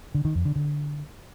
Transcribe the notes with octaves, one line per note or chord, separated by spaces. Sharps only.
D3
D#3
F2
D3
D3